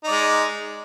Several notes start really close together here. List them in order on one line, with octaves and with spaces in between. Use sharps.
D#4 D5 G#3